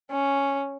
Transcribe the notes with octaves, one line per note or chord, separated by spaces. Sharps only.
C#4